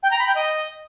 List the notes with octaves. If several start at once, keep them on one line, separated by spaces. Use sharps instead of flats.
G5
A#5
B5
G5
D#5